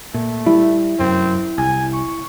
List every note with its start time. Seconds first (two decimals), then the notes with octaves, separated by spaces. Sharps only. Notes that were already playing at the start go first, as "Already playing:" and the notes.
0.14 A#2 A3
0.46 G3 E4
0.99 F1 F#2 C4
1.58 C2 G#5
1.93 C#6